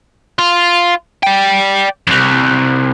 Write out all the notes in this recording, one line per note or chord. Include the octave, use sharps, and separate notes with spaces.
F4
D5 G5
C2 F2